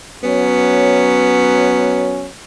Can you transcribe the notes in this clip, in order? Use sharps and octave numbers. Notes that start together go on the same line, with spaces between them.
F#3 B3 C#4